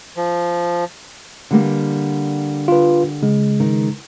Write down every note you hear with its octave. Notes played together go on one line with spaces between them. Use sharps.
F3
D3 G3 A#3
F4 B4
C#3 G#3
D#3